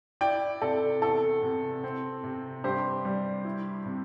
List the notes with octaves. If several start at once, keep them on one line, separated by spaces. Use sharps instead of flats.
E4 D5 G5
C3 A4 D5
E2 A4
C3
C4
C3
G2 G4 C5
G3
E4
C3